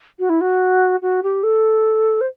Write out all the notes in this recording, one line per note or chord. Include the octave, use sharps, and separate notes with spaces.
F#4
E4
F#4
F#4
G4
A4
C5